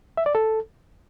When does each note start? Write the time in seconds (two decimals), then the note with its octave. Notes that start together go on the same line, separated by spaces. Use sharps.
0.17 E5
0.26 D5
0.35 A4